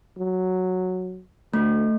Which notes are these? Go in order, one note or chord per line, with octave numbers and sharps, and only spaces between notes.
F#3
D2 A3